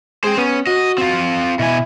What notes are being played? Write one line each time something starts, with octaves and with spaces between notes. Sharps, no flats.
G#3 C5 G5
B3 C#4
F#4 D#5
C4 F4
B2 E4 G#5